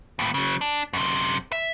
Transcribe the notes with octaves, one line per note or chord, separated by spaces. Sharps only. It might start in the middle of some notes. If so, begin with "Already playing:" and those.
D#2 A2
C#3 F#3
D4
F#2 C3
E5